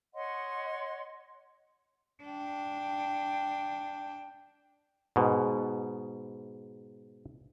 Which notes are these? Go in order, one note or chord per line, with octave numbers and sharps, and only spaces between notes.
C#5 D#5 F#5 C6
D4 G5
G#2 B2